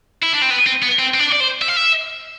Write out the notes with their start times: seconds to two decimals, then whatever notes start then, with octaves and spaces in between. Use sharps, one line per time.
0.23 E4
0.33 D4
0.42 C4
0.50 B3
0.67 C4
0.82 B3
0.99 C4
1.14 C4
1.20 D4
1.32 D5
1.40 C5
1.62 E5
1.68 F5
1.76 E5